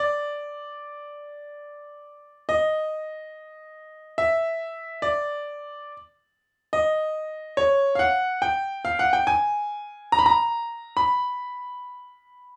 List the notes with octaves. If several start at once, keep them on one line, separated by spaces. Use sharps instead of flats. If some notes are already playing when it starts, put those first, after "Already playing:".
Already playing: D5
D#5
E5
D5
D#5
C#5
F5
F#5
G5
F5
F#5
G5
G#5
A#5
B5
A#5
B5